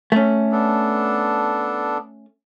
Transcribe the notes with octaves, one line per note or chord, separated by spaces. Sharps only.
A3 C#4
B3 D4 A4